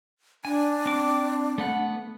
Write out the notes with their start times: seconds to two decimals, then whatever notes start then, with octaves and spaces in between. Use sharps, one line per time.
0.45 D4 G#5
0.86 C4 D6
1.58 A3 B3 F#5